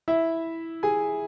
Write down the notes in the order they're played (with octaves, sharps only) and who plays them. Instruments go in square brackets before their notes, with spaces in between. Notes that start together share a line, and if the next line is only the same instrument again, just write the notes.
[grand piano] E4 E5
G#4 G#5